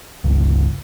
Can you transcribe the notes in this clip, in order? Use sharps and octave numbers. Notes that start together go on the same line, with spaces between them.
G1 C#2